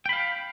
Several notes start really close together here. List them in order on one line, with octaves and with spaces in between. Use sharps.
G5 B5 F5